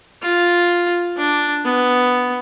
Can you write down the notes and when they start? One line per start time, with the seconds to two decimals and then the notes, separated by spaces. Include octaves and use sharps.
0.22 F4
1.17 D4
1.64 B3